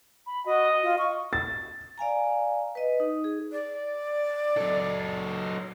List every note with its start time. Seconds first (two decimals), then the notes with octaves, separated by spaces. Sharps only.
0.26 B5
0.45 F#4 D#5
0.83 F4
0.99 C#6
1.33 A6
1.98 D5 F5 G#5 A#5
2.75 B4 D#5
3.00 D#4
3.24 G#4
3.52 D5
4.57 F#3 A4